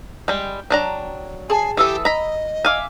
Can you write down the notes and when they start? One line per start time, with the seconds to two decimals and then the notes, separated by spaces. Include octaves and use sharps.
0.28 G3 G#3 G5
0.70 F#3 D4 A#5
1.50 G#4 G#5 A5
1.77 E3 G4 A4 D#6 E6
2.05 D#5 A#5 B5
2.65 E5 F5 G#5 D6